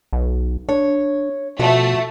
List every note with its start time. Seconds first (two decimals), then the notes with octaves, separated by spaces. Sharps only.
0.13 B1
0.69 D4 C#5
1.59 B2 F3 A3 F#4